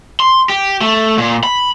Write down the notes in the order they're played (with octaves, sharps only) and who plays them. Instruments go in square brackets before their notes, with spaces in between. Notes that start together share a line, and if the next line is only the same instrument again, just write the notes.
[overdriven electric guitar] C6
G4
A3
A#2
B5